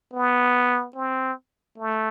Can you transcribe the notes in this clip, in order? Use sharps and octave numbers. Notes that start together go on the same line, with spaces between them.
B3
C4
A3